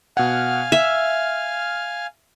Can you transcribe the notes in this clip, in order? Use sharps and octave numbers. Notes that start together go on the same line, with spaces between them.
B2 F5 F#5 G#5 F6
E5 E7